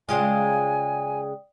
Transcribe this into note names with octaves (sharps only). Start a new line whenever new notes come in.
C#3 G#3 F4 D5 G5 G#5 D#6